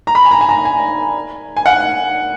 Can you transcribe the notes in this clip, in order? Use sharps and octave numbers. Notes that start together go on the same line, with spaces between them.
A#5
B5
G#5
A#5
G#5
A#5
G#5
G#5
F#5